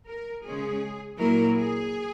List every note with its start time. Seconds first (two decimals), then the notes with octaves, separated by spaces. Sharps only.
0.09 A#4
0.46 C#3 G#3 C#4 G#4
1.19 A#2 F#3 A#3 E4 A#4
1.57 G#4